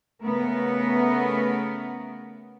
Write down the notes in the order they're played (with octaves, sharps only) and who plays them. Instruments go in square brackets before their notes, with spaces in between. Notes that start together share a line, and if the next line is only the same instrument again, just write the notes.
[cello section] C#3 A3 B3 A#4